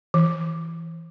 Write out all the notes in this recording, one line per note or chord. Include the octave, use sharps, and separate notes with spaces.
E3